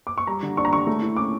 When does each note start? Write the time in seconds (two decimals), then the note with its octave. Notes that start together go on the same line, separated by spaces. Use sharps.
0.07 D6
0.18 C#6
0.27 G3 A#5
0.43 D3
0.57 D4 C#6
0.65 A#5
0.73 D3 C#6
0.87 A3
1.01 E4
1.16 C#4 D6